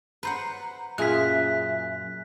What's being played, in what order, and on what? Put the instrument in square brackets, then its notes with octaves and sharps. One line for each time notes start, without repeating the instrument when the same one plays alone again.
[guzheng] B4 C5 F#5 [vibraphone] A#5
[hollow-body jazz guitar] F#2 F4 G#4 [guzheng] A#2 [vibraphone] E5 [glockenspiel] F#6 B6